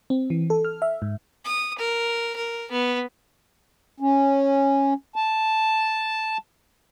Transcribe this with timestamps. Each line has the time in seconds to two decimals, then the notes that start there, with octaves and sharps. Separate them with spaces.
0.10 C4
0.30 E3
0.50 A4
0.65 F6
0.82 E5
1.02 G#2
1.45 D#6
1.79 A#4
2.36 A#4
2.71 B3
4.00 C#4
5.16 A5